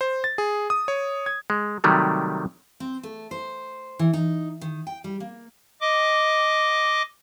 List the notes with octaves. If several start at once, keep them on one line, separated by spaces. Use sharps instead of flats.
C5
A6
G#4
D#6
C#5
G#6
G#3
C3 D#3 F#3 G3 A3
C4
A3
C5
E3
D#4
D#3
G5
G3
A#3
D#5 D6